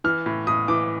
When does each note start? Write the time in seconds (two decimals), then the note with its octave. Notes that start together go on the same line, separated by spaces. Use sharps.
0.04 E3 F6
0.26 A2
0.47 A2 D#6
0.68 E3 D6